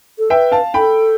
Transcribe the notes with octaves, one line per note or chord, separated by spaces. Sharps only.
A4
B4 E5 G5
F5 A5
A4 G5 B5